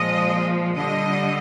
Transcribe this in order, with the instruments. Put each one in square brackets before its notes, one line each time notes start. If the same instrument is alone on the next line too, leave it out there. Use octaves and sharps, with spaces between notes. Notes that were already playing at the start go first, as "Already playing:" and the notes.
Already playing: [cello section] A#2 F3 G#3 D#5
D3 G3 D#5